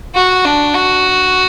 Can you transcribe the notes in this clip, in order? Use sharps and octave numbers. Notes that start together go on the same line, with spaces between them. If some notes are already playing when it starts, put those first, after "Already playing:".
F#4
D4
F#4